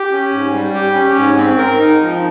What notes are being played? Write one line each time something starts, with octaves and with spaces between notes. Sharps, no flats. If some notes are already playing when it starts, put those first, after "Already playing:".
Already playing: G4
C#4
G#2
G3
G4
C#4
G#2
C4
A#4
D#4
F3